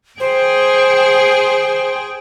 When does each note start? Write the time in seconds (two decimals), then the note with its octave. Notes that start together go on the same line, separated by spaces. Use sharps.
0.20 G#4 C5 G5